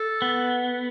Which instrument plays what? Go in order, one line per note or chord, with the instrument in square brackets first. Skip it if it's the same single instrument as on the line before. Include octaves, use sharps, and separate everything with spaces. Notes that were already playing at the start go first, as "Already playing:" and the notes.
Already playing: [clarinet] A4
[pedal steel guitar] B3